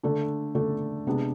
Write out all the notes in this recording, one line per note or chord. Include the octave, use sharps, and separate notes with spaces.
D3 A3 D4 A4
D3 A3 D4 A4
C3 G#3 B3 D4